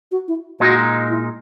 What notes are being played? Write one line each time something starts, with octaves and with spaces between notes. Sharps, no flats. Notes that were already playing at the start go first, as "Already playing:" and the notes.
F#4
E4
A#2 G#3 D#4 F#4
E4